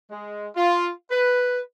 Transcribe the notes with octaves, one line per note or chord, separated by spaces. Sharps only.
G#3
F4
B4